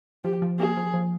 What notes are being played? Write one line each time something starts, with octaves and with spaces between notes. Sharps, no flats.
F3 G4
F3
A#3 G#4
F3
F3